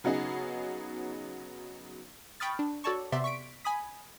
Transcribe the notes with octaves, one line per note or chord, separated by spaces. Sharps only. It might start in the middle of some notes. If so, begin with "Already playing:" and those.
C#3 F#3 B3 D#4 G#4
G5 B5 C#6 D#6 F6 A6
D4
F#4 A4 C#5 D5 A5 C#6
C3 B3 G4 D5 E5 C6
C#6 B6 D7
G#5 B5 D#6 B6